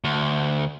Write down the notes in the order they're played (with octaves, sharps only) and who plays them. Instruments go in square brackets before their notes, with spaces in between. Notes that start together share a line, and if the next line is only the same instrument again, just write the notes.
[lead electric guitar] D2